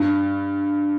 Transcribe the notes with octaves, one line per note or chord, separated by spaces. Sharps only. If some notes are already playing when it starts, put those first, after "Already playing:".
Already playing: G2